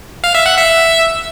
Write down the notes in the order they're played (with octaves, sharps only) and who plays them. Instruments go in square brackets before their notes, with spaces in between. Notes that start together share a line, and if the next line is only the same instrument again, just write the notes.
[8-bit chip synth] F5
E5
F#5
E5